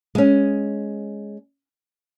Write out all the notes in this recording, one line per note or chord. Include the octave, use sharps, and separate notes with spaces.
G#3 C#4